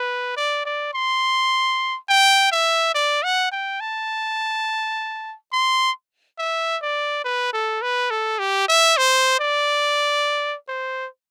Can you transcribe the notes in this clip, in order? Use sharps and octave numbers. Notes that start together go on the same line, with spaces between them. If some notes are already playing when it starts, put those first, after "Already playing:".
Already playing: B4
D5
D5
C6
G5
E5
D5
F#5
G5
A5
C6
E5
D5
B4
A4
B4
A4
G4
E5
C5
D5
C5